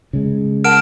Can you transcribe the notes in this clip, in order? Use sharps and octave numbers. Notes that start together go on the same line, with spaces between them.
C#3 G#3
A#4 F#5 A5 F6 D7 E7